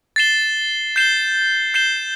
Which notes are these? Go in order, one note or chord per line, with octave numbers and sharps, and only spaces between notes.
A6 C7 E7 G7
G6 C7 E7 G7
G6 C7 E7 G7